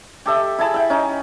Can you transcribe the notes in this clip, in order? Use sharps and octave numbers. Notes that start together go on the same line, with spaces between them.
G4 A4 E5
E4 G#4 A5 B5
E5 G5
C#4 D#4